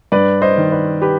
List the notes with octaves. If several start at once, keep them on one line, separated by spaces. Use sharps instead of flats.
G2 B4 D5
C5 D#5
D#3
B4 D5
G4 B4